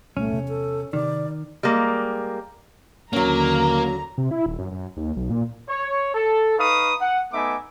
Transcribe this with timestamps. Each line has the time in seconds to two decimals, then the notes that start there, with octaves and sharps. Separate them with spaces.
0.17 C2 A#2 G3 A3 C#4
0.31 E2 C3
0.48 A4
0.93 C3 D#3 D5
1.63 G3 G#3 A#3
3.13 D#2 D3 F#3 A#3 C#4 A#5
4.18 C3
4.31 E4
4.46 D#1
4.59 F#2
4.72 F#2
4.97 D#2
5.16 B1
5.30 A#2
5.69 C#5
6.15 A4
6.59 D#4 B4 F5 C#6 D#6
7.01 F#5
7.33 A3 B3 D#4 E5 G#5 D6